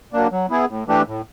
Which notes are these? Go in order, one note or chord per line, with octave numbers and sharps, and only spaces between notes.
F#3 A#3 D4
F#3
B3 E4 G#4
A2
E3 A3 D4 G4
A2